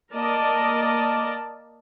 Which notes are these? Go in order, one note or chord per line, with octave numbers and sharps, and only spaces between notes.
A#3 A#4 D5 D#5 A5